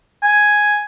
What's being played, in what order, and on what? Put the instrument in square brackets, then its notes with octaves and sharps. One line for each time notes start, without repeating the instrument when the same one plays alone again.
[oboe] G#5